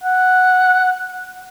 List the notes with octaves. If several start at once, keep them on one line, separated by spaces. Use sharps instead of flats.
F#5